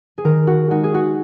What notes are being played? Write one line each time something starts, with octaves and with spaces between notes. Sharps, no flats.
G#4
D#3 A#4
F#4
G#3 D#4 F#4
G#4
F#4